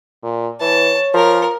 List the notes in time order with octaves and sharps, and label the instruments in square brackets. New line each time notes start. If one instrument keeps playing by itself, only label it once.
[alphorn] A#2
[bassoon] E3 [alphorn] C#5 [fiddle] A5
[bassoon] F3 [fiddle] A#4